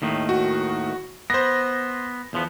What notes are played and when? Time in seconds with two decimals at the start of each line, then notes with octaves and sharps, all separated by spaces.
0.02 D#2 A2 D#3
0.29 F#4
1.30 B3 C5 A#6
2.33 E2 F3 B3